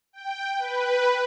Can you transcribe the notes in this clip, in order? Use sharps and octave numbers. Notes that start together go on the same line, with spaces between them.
G5
B4